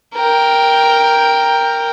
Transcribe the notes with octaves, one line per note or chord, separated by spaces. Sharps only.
A#4 G5